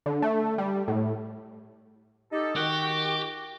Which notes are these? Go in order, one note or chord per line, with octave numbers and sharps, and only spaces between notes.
D3
A3
G3
A2
D#4 G4 A4
D#3 F#4 G4